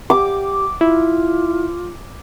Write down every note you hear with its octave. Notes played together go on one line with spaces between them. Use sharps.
G4 D6
E4 F4